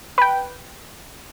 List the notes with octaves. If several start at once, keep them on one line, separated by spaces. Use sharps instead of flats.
B4 G5